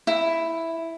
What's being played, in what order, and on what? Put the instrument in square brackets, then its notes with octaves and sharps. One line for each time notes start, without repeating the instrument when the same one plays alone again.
[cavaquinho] E4